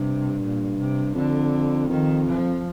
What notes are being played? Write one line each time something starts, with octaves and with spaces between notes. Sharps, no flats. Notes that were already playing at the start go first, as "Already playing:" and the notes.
Already playing: G2 C3
A#2
C3
F2 D3
F2 D#3
F3